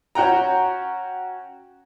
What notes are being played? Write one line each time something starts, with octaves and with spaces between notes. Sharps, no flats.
C#4 F#4 F#5 G5 A#5